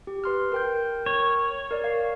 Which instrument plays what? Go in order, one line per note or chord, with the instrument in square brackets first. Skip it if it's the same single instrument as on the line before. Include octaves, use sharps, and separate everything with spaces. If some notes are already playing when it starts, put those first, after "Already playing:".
[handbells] G4
B4 C6 F6
A#4 G5 G6
[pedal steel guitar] C#5
[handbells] A#4 D5
F5